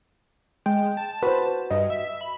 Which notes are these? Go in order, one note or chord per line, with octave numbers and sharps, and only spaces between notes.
G#3 G5
A5
F#4 B4 C5
G2 D#5
E5
B5